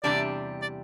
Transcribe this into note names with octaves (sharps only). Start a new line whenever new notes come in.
E2 C3 G3 D4 D5
D5